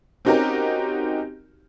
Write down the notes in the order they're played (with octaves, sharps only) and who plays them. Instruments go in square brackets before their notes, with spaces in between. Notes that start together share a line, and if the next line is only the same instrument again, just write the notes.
[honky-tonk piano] C4 C#4 D#4 F#4 G4 A#4